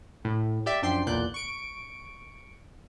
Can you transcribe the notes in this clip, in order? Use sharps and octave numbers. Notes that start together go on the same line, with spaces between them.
A2
G4 D5 E5
F#2 F3 D4 G5 C6 C7
B1 E2 A#2 D5 F#6 G6
C#6 D7